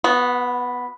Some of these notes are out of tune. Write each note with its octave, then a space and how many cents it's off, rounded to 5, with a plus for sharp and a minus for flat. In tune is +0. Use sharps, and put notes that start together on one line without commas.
B3 +0 F#4 -35